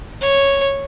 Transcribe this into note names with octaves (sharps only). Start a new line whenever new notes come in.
C#5